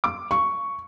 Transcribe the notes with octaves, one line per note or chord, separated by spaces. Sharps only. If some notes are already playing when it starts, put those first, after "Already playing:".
D6
C#6